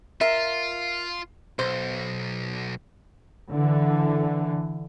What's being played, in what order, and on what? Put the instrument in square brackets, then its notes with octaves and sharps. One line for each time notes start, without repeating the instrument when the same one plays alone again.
[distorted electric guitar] F4 [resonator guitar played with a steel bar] A#4 E5
[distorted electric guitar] B1 [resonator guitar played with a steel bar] C5
[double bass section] D3 E3